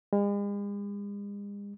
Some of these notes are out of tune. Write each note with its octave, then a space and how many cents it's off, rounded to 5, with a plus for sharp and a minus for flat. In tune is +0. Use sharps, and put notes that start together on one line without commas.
G#3 -45